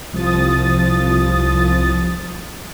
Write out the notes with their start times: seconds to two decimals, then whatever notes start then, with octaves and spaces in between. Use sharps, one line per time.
0.13 C2 F3 D#6 A6